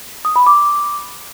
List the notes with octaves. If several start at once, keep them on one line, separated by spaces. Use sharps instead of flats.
D#6
B5
D6